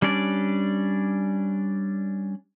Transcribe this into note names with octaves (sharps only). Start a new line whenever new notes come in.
G3 C#4 D4 D5